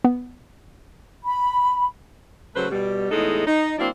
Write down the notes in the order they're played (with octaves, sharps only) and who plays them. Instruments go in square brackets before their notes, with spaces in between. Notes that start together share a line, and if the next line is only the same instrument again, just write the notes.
[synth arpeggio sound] B3
[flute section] B5
[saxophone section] C#3 F#3 A3 B4 C5
B2 G3
E2 A2 G#3 D#4 A4
D#4
F#3 A#3 C4 D4 E4